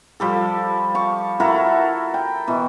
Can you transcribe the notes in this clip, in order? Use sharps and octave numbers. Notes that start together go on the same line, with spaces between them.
F3 G3 A4
A5 C#6
E4 F#4 A4 A#4
G5
B2 E3